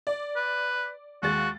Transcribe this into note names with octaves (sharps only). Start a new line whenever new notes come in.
D5
B4
D#2 G#3 F#4 A6